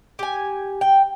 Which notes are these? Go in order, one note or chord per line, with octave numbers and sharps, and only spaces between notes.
G4 G#5
G5